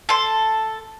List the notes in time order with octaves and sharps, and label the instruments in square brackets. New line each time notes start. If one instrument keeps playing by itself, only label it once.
[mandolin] A4 C6